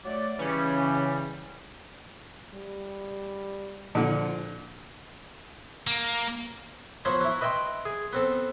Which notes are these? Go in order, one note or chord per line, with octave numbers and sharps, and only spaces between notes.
F#3 A3 D5
C#3 E3 G3 C#4
G3
A#2 D3 F3
A#3
F3 F#3 B3 C5 C#5
F#3 E4
B4 D#5 E5 G5 C6
G#4
B3 C4 A4